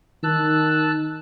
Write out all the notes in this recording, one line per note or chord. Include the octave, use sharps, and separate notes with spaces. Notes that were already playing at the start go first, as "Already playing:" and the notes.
D#3 A5 E6 F#6